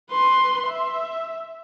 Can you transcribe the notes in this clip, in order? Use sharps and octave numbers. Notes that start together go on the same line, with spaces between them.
B4 C6
E5